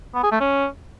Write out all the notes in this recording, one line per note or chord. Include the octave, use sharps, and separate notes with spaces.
B3
G#4
A3
C#4